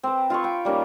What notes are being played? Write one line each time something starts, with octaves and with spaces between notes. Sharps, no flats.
C4 B4
F4 F5 C6 C#6
G5 B5
G3 A#3 C#4 D#4